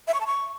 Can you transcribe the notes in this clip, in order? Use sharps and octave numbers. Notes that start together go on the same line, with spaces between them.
E5
C#6
A5
C#6